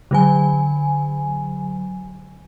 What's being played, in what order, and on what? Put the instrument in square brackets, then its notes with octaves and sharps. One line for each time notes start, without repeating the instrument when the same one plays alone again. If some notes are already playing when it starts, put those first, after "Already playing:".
[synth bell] D3 F#3 G#5